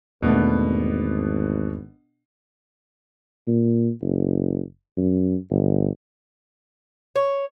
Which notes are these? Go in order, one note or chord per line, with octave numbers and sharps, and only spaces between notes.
G#1 E2 B2 A3 B3 D4
A#2
F#1
F#2
G1
C#5